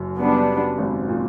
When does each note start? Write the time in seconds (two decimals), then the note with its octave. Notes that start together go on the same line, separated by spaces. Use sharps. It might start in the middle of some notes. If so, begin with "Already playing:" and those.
Already playing: F#1 F#2
0.19 G3 B3 D4
0.78 G#1 G#2
1.09 A#2